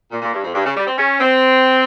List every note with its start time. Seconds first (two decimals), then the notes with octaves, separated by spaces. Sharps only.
0.11 A#2
0.22 A#2
0.33 G2
0.44 F2
0.54 G2
0.65 C#3
0.77 G3
0.87 C4
0.98 C#4
1.20 C4